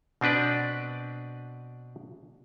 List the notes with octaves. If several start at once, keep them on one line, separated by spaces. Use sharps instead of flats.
B2 C4 D4 B4 D5